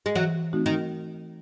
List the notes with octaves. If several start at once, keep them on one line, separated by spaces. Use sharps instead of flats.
G#3
E3 F#3
A3 C4 D#4 F#4
D#3